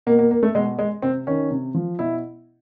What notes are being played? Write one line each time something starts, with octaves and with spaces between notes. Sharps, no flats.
B2 A#3
A#3
A#3
A3
B2 G#3
G#3
C3 C4
D#3 C#4
C3
F3
B2 E4